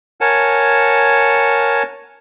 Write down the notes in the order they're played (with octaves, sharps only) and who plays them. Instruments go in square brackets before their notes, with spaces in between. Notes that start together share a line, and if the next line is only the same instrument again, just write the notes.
[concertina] A#4 C#5 F#5 G#5 A5